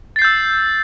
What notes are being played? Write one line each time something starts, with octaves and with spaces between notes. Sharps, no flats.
E6 G6 A6 C7